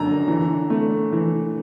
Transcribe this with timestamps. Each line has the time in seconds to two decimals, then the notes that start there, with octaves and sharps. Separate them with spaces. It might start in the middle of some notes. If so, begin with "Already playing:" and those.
Already playing: F#2 D3 A#5
0.28 E3
0.70 A3
1.13 E3